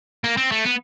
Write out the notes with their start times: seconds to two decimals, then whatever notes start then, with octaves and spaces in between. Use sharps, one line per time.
0.24 A#3
0.37 C4
0.52 A3
0.65 B3